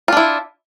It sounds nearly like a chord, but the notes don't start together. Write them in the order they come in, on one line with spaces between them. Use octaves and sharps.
F4 D4 E4